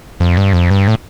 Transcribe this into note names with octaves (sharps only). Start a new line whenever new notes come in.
F2
G2
F2
G2
A2